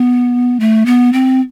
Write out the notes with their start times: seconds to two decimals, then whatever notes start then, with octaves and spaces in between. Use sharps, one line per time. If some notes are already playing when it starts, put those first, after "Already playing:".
Already playing: B3
0.60 A3
0.86 B3
1.13 C4